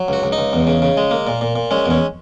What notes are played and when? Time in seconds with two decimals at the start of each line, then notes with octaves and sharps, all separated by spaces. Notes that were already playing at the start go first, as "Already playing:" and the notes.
Already playing: F#3
0.08 C#2 F#4
0.23 C#2
0.32 D#4
0.38 C#2
0.53 E2
0.67 C#3
0.82 C#3
0.97 G#3
1.11 A#3
1.27 A#2
1.41 A#2
1.56 A#2
1.71 G#3 C#4
1.86 E2 C#4